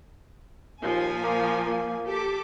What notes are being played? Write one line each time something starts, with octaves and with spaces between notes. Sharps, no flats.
D#2 A#2 F3 G#5
A#3
A#3
G4 A4 D6